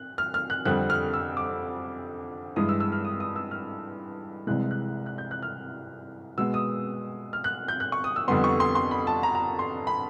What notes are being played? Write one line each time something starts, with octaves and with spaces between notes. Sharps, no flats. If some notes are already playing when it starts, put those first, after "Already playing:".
Already playing: F#6
F6
F6
F#6
F2 D3 G3 C4 F#6
F6
E6
D6
G2 E3 G#3 D#6
E6
E6
F6
D#6
D#6
E6
F6
C2 C3 E3 G#3 F#6
F#6
F#6
G6
F#6
F6
B2 G#3 B3 E6
D#6
F6
F#6
G6
F#6
C#6
D#6
E6
F2 D3 G3 B3 C6
C#6
C6
C6
B5
A5
A#5
A#5
C6
B5